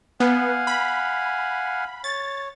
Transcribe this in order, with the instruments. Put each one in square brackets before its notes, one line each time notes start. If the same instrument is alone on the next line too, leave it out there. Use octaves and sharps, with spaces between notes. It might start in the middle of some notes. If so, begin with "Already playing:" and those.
[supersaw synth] B3 [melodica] F5 F#5 G#5
[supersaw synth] B5
[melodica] C#5 [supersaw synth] A6